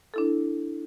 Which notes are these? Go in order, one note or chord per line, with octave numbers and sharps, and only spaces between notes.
D4 E4 A4